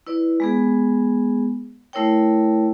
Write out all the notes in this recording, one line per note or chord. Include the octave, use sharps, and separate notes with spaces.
E4 B4 D5
G#3 B3 G#4
A3 E4 A#4 C#5 G5